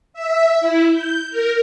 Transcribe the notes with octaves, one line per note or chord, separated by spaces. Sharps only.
E5
E4
G6
A#4